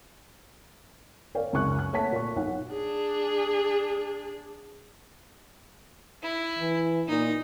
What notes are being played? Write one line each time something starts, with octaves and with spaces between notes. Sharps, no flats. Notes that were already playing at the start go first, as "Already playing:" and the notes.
A#4 C#5 D5 F5 G5
C#2 F#2 C#6 F#6
F#6
A3 A#3 C#5 F#5 A5 B6
A#2 C#6
B1 C#5 F#5
D4 G#4
E4
E3
A#2 D#4